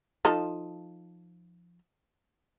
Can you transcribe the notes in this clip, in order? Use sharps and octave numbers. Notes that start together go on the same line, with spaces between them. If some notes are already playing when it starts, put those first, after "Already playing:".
F3 D#4 A4